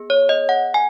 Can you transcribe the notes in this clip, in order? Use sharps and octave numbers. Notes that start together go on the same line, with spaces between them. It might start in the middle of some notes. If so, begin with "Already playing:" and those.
Already playing: B3 G#4
C#5
D#5
F#5
G#5